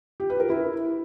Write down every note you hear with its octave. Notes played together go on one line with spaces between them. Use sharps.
G4
B4
A#4
E4